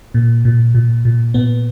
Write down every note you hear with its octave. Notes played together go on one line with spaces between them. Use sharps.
A#2
A#2
A#2
A#2
A#2 B3